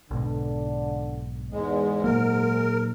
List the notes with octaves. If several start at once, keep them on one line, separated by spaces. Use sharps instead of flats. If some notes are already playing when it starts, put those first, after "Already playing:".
B1 G#2 B2 D3
E2 G#2 G#3
A#2 F#3 A#3 A#4